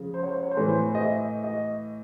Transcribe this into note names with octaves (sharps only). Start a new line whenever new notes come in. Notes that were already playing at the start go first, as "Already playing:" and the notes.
Already playing: C#3 F3
C5
C#5
C5
C#5
C5
A2 E3 A3 B4
C5
D#5
E5
D#5